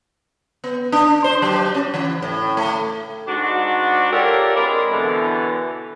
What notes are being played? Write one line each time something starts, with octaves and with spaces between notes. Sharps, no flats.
B3
D4
C5
F#3
C#4
E3
A2
A3
G#2 D4 F#4
F4 G4 A4 A#4 C#5 D5
G#3 C4 D4 A#4 D5 B5
B2 D3 E3